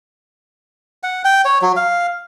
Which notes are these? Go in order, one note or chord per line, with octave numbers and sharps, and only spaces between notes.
F#5
G5
C#5
F#3
F5